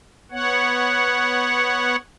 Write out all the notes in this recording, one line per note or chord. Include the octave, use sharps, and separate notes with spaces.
B3 C#5 F#5